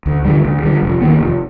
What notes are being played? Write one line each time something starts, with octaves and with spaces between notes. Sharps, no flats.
D2
D3 G3
D2
D3 G3
F1
D#2 D#3 B3
F1